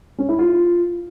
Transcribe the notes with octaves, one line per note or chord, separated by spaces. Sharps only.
C#4
E4
F4